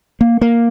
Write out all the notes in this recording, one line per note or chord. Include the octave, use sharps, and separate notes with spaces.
A#3
A#3